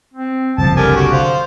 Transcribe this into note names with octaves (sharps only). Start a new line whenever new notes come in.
C4
F#1 C2 F3 A5
D3 G4 A#4 G#5
F#4 G4
C5 F5